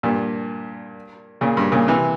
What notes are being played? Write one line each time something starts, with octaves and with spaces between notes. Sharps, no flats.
G2 A#2
A#2 C#3
G2
A#2 C#3
C3 E3